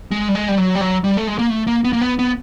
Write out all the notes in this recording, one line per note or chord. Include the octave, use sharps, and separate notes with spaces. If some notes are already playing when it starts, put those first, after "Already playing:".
G#3
G3
G#3
G3
F#3
G3
F#3
G3
A3
G#3
A#3
A3
A#3
B3
A#3
B3
B3